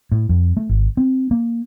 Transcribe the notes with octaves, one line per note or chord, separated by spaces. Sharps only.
A2
F2
A3
G#1
C4
A#3